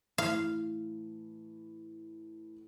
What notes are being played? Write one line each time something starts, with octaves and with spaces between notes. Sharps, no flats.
A2 E3 F5